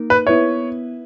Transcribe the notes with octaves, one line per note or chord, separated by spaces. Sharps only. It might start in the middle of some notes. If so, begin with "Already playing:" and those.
Already playing: A#3 D#4 A#4
B4
B3 E4 B4 C#5 E5